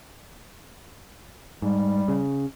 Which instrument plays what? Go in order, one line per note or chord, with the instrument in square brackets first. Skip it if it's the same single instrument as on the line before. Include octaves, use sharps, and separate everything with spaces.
[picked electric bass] G#2 [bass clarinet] G3
[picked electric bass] C#3